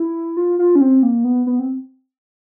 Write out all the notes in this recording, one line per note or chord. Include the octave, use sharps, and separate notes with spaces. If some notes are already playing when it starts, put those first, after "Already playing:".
Already playing: E4
F4
F4
C#4
C4
A#3
B3
B3
C4